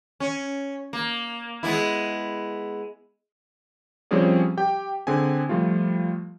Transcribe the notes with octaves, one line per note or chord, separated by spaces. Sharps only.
C#4
A#3
G#3 B3 E4
F3 G3 C4 C#4 G#4 D5
G4 G5
D3 C4 G#4 G#5
F3 G3 A3 F4